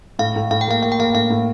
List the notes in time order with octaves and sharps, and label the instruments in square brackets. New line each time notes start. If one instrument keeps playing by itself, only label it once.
[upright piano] A2 [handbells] F5
[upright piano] A2
[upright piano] A2 [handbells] F5
[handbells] G5
[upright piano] A#3 [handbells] F5
[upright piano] A#3 [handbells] F5
[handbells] G5
[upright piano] A#3 [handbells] F5
[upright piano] A2 [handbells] F5
[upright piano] A2